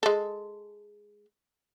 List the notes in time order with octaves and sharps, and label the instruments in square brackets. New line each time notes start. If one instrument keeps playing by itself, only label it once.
[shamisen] G#3 A4